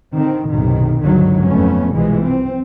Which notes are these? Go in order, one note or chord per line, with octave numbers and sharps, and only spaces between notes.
D3 D#3 C4
B1 F#2 A2 C3 D#3
G1 C#2 G#2 D3 D#3 F#3
F2 A3 B3 C#4
C2 B2 E3 F3 G#3
C4